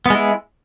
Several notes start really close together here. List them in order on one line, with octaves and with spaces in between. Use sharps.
B3 G#3 E4